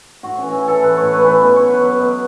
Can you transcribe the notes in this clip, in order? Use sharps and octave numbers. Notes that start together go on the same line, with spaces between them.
A2 F#4
E3 C#4
E4
E3 A4
A2 B4
A2 C#5
B4
E3
B4
B2 B4
F#3 C#5
B4
F#3
B4
B2